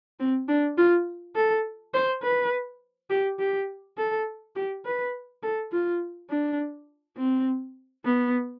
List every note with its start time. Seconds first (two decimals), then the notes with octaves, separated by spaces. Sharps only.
0.20 C4
0.49 D4
0.78 F4
1.36 A4
1.94 C5
2.23 B4
3.10 G4
3.39 G4
3.98 A4
4.56 G4
4.85 B4
5.43 A4
5.72 F4
6.30 D4
7.17 C4
8.05 B3